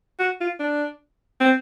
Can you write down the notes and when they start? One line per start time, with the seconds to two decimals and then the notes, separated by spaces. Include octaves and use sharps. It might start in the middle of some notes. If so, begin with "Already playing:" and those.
0.20 F#4
0.41 F4
0.60 D4
1.40 C4